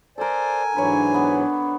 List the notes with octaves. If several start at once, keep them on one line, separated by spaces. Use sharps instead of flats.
A4 A#4 C5 D5 G#5
G#2 E3 F#3 D4 B4 C#5
B3 B4